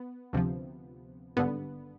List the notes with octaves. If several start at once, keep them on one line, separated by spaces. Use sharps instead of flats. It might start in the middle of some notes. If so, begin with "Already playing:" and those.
Already playing: B3
D2 C3 F3
G#1 G2 D3 B3